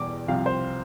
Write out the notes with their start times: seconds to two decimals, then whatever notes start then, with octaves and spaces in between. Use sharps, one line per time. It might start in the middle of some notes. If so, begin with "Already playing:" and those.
Already playing: E2 B2 G3 D6
0.28 C2 C3 F3 F5
0.46 C5